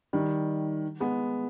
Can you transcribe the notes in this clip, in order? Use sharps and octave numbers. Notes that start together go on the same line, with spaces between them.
D#3 G3
G#3 B3